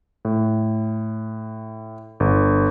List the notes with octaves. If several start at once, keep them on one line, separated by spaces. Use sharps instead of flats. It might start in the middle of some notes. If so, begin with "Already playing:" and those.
A2
G1